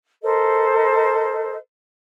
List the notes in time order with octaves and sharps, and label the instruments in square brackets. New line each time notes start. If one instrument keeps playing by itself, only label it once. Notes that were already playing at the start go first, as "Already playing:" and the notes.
[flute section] A4 A#4 C5 D#5